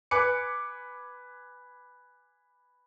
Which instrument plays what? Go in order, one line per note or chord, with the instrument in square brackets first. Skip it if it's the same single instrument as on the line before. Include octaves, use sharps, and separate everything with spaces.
[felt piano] B4 G#5 D6 C#7